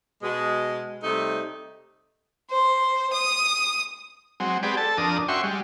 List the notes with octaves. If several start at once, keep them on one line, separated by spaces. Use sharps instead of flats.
B2 G#3
C3 G3 A3 D#4
C5
D#6
F#3 G#3 C4
C4 G4 G#4 B4 D5
A4 A5
F2 D4 A#4 D#6
C#4 F#4 E5 G5 C6 C#6
G3 G#3